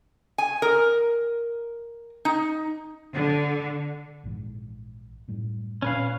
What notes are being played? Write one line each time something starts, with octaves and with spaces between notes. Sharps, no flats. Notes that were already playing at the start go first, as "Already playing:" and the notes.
G#5
A#4
D#4
D3
A#1 G#2 E3
F#2 A2 G3
A#2 C#4 B4 F5